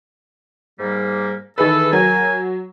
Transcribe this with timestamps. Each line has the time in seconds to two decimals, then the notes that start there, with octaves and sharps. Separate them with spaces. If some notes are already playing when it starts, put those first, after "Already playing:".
0.79 G#2 G3 A#3
1.58 D#3 E3 G#4 A4 B4
1.93 F#3 A#4 G#5